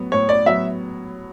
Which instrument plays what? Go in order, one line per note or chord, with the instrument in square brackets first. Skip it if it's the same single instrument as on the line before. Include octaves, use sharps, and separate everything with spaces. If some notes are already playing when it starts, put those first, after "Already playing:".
Already playing: [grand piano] A2 F#3 B3
[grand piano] A2 [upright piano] C#5
[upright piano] D5
[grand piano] F#3 B3 [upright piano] E5